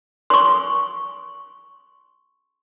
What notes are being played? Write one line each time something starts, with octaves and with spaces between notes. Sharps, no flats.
C6 C#6